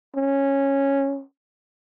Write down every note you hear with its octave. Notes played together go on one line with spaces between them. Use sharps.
C#4